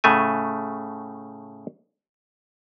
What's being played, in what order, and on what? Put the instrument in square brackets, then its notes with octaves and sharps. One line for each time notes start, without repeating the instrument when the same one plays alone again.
[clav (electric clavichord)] A2 C#3 A3 G#5